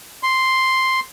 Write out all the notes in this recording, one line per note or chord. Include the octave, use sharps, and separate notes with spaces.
C6